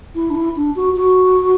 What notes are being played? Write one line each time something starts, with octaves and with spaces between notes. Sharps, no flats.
E4
D4
E4
D4
F#4
F#4